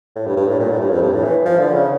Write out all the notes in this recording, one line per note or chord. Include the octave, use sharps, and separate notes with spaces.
A2
G2
G2
A2
A#2
A2
G2
F2
G2
A2
E3
F3
D3
C#3